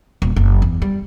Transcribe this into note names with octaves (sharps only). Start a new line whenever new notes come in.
D#1
F#1
E2
G3